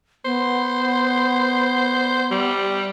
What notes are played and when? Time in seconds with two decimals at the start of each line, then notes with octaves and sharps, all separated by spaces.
0.25 B3 C5
2.31 G3